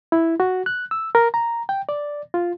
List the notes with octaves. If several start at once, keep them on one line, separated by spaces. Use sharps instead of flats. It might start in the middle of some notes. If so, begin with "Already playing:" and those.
E4
F#4
F#6
E6
A#4
A#5
G5
D5
F4